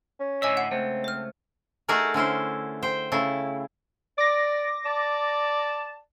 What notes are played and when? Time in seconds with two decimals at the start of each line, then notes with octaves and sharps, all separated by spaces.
0.20 C#4
0.42 A2 D3 C#5 D#5 E5 G#5
0.57 F#5 C7
0.72 C#2 A3 C4
1.04 C5 F6
1.88 A3 D#4 F#4 G#4 A#4
2.14 D3 C#4 E4 C5
2.82 C5 G5
3.12 C#3 A3 E4
4.18 D5 D6 A#6
4.86 D5 A5